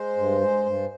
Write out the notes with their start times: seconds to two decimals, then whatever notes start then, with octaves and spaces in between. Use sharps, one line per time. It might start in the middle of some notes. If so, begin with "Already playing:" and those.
Already playing: G#3 C5
0.17 G2
0.41 G#3
0.66 G2